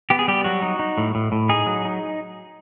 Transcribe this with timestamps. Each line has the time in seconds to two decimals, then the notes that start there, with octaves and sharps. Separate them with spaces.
0.10 B3 G4
0.19 G#4
0.28 G3 G4
0.44 F#3 F#4
0.62 D#4
0.79 D#4
0.98 A2
1.15 A2
1.32 A2
1.49 D#4 G#4
1.67 F#3
1.85 D#4